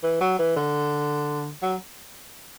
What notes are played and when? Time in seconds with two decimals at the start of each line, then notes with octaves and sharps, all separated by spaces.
0.03 E3
0.21 F#3
0.39 E3
0.56 D3
1.62 F#3